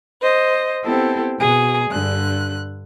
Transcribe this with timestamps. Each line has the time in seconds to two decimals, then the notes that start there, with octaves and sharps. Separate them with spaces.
0.22 C5 D#5
0.83 B3 C4 E4 G4 A4
1.39 B2 G#4
1.90 G2 D3 F#6